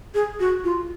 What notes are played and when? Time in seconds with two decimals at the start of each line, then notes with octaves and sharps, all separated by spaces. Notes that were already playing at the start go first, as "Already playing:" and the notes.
0.15 G#4
0.40 F#4
0.64 F4